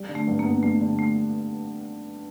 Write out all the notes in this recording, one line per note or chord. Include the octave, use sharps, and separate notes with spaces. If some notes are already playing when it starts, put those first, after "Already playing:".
Already playing: G3
D3
A3
G2
A#3
B3
G3 A3
D3
A3